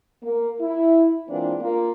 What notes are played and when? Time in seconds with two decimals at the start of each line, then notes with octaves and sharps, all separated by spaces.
0.23 A#3
0.60 E4
1.30 G#2 E3 A#3 C4 D4 F4
1.61 A#3 F4 A#4